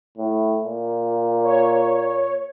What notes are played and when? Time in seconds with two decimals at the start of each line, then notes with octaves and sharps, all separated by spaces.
0.18 A2
0.64 A#2
1.44 C#5